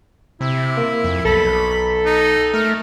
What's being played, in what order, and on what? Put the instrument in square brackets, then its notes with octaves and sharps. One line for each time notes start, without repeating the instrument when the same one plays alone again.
[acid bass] C3 [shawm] E4
[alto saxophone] A#3
[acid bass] F2
[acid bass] B1 [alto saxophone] A4 [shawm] B5
[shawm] D#4
[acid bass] A3 [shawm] A#4